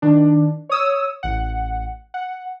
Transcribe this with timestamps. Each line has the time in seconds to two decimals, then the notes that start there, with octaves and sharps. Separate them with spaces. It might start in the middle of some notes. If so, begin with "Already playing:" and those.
0.02 D#3 D4
0.69 C#5 D#6 E6
1.23 A1 F#5
2.14 F#5